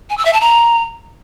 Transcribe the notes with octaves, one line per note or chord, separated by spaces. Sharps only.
G#5
E6
E5
A5
A#5